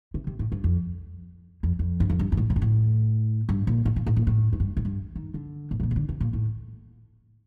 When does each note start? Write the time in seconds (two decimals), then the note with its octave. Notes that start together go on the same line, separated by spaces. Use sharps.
0.14 C3
0.27 C3
0.39 A2
0.52 G2
0.64 F2
1.63 F2
1.79 F2
2.00 G2
2.10 F2
2.19 G2
2.32 G2
2.37 A2
2.50 A#2
2.56 G2
2.62 A2
3.49 G2
3.67 A#2
3.85 A2
3.96 A#2
4.06 A2
4.16 A#2
4.27 A2
4.53 A2
4.60 G2
4.77 A2
4.85 G2
5.15 D#3
5.34 D3
5.71 A#2
5.80 A2
5.83 A#2
5.91 C3
5.96 D3
6.09 C3
6.20 A#2
6.33 A2